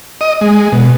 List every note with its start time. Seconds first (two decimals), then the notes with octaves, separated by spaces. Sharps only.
0.21 D#5
0.41 G#3
0.72 B2